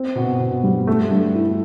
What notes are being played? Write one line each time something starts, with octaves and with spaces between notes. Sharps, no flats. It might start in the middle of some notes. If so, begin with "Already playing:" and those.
Already playing: C4
B2
B2
G3
A3
G2
E4